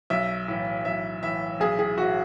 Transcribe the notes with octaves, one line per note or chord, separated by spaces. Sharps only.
B1 E5
A2 E3
B1 E5
A2 E3 E5
B1 G#4
G#4
A2 E3 F#4